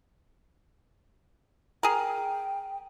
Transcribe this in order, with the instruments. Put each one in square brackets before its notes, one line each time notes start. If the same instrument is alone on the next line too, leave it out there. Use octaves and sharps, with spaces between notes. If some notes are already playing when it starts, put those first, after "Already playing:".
[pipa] G#4 A#4 [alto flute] G5